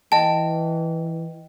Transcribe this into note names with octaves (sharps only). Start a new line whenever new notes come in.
E3 D#5 G5 A5